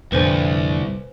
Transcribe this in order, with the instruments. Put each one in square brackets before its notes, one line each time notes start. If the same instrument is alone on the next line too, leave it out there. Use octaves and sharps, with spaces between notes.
[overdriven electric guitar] C2 [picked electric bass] F2 A#2 D3 [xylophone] B4 C5 G#5